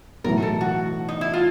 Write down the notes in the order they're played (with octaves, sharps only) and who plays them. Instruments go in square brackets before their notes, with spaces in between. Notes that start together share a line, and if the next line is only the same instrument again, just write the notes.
[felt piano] B1 A2 E3 [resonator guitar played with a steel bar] A#4
[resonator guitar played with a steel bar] A4
F#4
D#4
E4
F4